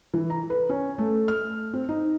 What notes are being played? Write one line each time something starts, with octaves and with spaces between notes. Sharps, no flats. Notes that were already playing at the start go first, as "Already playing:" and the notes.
E3
A#5
B4
C#4
A3
F6
C4
D#4